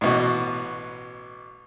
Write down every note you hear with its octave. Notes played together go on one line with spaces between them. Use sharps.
A1 B2 F#4